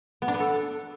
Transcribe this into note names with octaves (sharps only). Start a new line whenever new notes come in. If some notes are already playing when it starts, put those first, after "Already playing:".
B3
D4
B3
A4